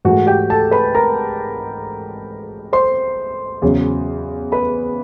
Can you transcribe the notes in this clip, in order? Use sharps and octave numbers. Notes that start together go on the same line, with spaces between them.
G#2 E3 A3 F#4 F#5
G4 G5
A4 A5
B4 B5
A#4 A#5
C5 C6
E2 C#3 F#3
B4 B5